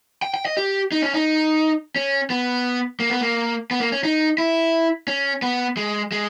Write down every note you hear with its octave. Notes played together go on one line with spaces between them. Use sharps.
G5
G5
D#5
G4
D#4
C#4
D#4
C#4
B3
A#3
B3
A#3
B3
A#3
C#4
D#4
E4
C#4
B3
G#3
G#3